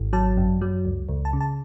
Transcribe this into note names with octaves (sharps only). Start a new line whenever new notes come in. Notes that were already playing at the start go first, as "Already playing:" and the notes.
Already playing: G#1
F#3 A5
F#2
F#3
C#2
C#2
A5
C#3
A5